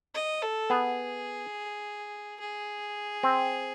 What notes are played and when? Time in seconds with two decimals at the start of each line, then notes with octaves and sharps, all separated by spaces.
0.14 D#5
0.42 A4
0.70 B3 G#4
2.40 G#4
3.23 C4